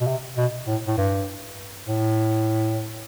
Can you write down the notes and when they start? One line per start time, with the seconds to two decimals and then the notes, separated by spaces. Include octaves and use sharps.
0.01 B2
0.07 C3
0.37 B2
0.67 A2
0.87 A2
0.97 G2
1.87 A2